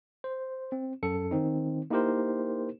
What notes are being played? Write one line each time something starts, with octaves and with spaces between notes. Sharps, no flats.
C5
C4
F#2 A4 C#7
D#3 C4 D#4
A#3 D#4 E4 G4 A#4 C5